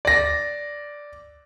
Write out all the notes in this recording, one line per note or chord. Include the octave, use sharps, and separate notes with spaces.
D5 A#6